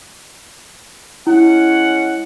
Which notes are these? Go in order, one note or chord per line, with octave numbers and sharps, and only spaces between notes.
G#3 C#4 E4 F#5